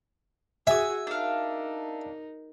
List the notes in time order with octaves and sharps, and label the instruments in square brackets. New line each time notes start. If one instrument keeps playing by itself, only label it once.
[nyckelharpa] F#4 G#4 [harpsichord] E5 [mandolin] G#5 D#6
[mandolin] D4 F5 [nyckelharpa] D#4 A#4